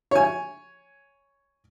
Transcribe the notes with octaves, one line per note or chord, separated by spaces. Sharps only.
C#5 G#5